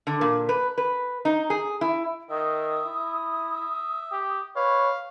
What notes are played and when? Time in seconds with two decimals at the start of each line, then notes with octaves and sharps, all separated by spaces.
0.07 D3
0.21 A#2
0.49 B4
0.78 B4
1.25 D#4
1.50 G#4
1.81 E4
2.30 D#3 E5 D#6
2.85 E4
3.53 E5
4.12 G4
4.56 B4 C#5 F5